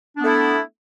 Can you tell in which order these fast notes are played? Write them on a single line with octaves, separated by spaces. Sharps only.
D4 B3 A3 E4